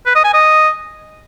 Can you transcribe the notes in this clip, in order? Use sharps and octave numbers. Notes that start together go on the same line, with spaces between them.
B4
D#5
G#5
D#5